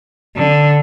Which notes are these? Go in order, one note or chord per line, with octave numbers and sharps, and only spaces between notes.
D3